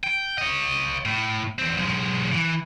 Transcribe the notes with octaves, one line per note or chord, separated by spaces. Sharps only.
G5
C#5 D#5
A2
E2 C4
B1 G#3
E3